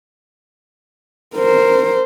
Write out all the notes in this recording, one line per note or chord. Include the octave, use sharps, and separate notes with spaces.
A#4 C5